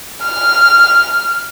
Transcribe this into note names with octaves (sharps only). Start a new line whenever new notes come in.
F6